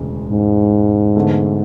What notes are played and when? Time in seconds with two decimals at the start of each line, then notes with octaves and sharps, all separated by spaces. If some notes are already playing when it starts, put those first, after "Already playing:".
Already playing: E1 D2 C#3 G#3
0.31 G#2
1.15 E2 D3 A3